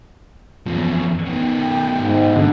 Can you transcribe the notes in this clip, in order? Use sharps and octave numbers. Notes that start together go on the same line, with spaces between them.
E2 F3 C#4
B2 D#3 G5
G#2
D3